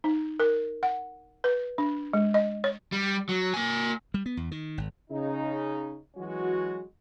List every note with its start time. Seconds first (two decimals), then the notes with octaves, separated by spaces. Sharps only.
0.04 D#4
0.40 A#4
0.83 F#5
1.44 B4
1.78 D4
2.13 G#3
2.34 D#5
2.64 C#5
2.92 G3
3.29 F#3
3.54 A#3 G#5
4.14 G3
4.26 B3
4.37 E2
4.51 D#3
4.78 G#1
5.10 C#3 D#4
6.16 E3 F#3 G#3 C#4 F#4